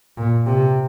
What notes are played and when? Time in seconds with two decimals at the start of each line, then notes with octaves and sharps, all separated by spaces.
0.17 A#2
0.46 C3